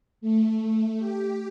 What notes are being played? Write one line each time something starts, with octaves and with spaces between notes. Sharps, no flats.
A3
G4